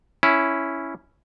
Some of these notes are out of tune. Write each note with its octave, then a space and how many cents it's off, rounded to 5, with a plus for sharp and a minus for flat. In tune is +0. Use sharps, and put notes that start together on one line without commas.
C#4 +0 E4 +0